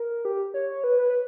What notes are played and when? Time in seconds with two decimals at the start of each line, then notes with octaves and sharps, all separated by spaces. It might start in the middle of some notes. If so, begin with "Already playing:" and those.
Already playing: A#4
0.25 G4
0.54 C#5
0.84 B4
0.98 B4
1.09 B4